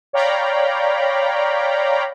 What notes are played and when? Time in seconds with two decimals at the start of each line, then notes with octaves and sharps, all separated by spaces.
0.13 C#5 D5 F5 G5 A#5 B5